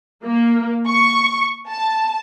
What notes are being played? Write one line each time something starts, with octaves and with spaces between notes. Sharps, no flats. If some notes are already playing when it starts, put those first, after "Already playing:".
A#3
C#6
A5